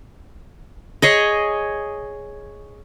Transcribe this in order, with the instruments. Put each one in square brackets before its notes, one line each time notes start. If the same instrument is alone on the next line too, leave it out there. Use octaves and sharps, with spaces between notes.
[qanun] G#4 C#5 D#5